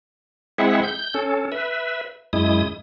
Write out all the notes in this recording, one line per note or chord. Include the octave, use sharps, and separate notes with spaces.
G#3 C4 E4 G#4 E5 F#5
G6
C#4 A4
B4 E5
F#2 G#3 E4 D#6